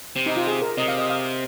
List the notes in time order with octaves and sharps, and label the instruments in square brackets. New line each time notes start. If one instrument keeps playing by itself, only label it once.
[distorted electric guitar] C3
[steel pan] D#4
F4
G#4
A#4
[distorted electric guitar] C3 [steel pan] D#5
[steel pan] F5
D#5
F5